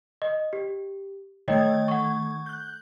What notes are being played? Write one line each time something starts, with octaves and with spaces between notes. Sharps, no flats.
D#5
G4
D#3 A3 C#5 D#5 G5 G#6
F#5 C#6
F#6 G6